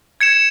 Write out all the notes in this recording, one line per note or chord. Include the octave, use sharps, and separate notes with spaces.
G#6 C#7 E7